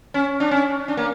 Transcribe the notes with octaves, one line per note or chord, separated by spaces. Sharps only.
C#4
D4
C#4
D4
A#3